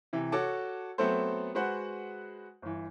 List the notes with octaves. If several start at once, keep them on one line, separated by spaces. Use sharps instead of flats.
C3 E3
F#4 A4 C#5 A5 D6
F#3 A3 B3 C4 A4 C5
G#3 F#4 B4 C5 F#5
G1 E3